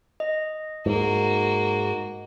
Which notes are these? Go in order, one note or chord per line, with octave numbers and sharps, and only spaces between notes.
D#5
G#2 A#3 F#4